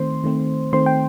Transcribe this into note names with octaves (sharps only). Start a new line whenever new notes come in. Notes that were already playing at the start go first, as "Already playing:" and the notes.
Already playing: D#3 A3 C4 C5 C6
D#3 A3 C4
D#3 A3 C4 C5 C6
G5